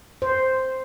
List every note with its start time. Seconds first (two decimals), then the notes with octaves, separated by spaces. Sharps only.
0.22 C5